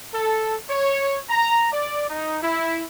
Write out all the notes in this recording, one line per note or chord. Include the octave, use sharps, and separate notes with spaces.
A4
C#5
A#5
D5
D#4
E4